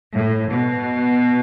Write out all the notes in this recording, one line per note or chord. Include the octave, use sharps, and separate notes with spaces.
A2
B2